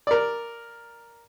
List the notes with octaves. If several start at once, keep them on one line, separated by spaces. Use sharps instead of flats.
A#4 D5